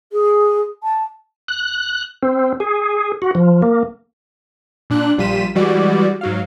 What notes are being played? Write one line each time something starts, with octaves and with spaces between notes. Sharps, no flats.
G#4
A5
F#6
C4
G#4
F#4
F3
A#3
A#2 D4 F#6
A#1 G3 F4 B6 D#7 E7
E3 G3 G#3 F#4 D5
G#2 F#3 F5